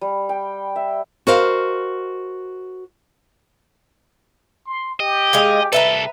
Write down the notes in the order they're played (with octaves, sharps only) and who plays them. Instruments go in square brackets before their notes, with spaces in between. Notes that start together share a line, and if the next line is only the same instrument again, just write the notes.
[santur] G3
G5
E5
[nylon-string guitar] F#4 A#4 C5 D#5 F5
[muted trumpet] C6
[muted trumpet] G4 [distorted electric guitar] D#5
[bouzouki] G#3 F5 G#5
[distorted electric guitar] C2 A4 [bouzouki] B4 E5 A#5